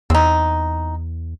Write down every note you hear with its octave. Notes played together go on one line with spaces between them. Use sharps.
E2 C4 D#4